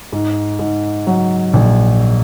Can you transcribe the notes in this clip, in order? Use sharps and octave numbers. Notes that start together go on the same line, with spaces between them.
G#2
G#2
F#3
A#1